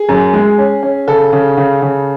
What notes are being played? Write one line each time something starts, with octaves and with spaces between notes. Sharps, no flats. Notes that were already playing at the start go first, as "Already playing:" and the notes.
Already playing: G#4
F#2
G#3
C#4
C#4
C#3 A4
C#3
C#3
C#3